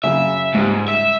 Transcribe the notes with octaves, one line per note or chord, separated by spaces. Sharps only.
F#2 C#3 E5
C#2 G#2 G3
E5